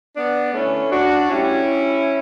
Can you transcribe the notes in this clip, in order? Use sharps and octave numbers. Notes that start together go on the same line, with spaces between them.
B3 D4
D3 A3 C#4 E4
D4 F#4
A2 G3 C#4 E4